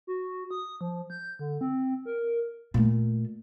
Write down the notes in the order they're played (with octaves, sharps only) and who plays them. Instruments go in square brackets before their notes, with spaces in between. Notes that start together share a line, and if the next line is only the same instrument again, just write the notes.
[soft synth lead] F#4
D#6
F3
G6
D3
C4
A#4
[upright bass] A#2 A3